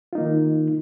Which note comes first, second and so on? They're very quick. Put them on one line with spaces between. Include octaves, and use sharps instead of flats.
F4 D#4 A#3 D#3